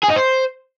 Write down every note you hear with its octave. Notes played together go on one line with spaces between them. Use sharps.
G#4
D#4
C5